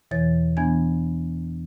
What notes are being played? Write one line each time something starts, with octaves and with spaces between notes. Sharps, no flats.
E2 B2 E3 C#5 A6
E3 B3 D4 G#5 G#6